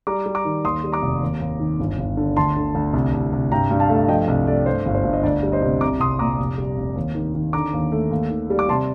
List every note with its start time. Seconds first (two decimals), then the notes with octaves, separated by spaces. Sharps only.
0.07 G3 A#5 D6
0.26 G3
0.35 A#5 D6
0.45 D#3
0.65 D#2 C6 D#6
0.84 G3
0.92 A#5 D6
1.02 F1
1.22 D#2
1.41 D#2
1.60 D#3
1.80 G1
1.98 G1
2.17 D3
2.37 D2 A5 C6
2.56 D3
2.75 D2
2.93 C2
3.14 C2
3.33 C2
3.52 G2 G5 A#5
3.71 G2
3.80 F5 A5
3.89 A3
4.09 F3 D#5 G5
4.28 C2
4.47 A3 D5
4.66 G2 C5
4.86 G1
4.95 C5
5.04 G2
5.13 D#5
5.23 D2 D5
5.43 G3
5.52 C5 D#5
5.62 C3
5.81 C2 A#5 D6
6.00 C2 C6 D#6
6.19 A#2 A#5 D6
6.39 F1
6.58 G3
6.78 F1
6.96 D#2
7.15 D#3
7.35 D#3
7.53 D3 A#5 D6
7.73 D#2
7.92 A3
8.11 D#2
8.30 D#3
8.50 G3
8.59 D6
8.69 C3 A5 C6